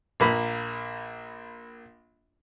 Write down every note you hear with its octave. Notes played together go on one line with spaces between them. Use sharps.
A#1 A#3 B5